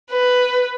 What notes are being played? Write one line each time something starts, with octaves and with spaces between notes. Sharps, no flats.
B4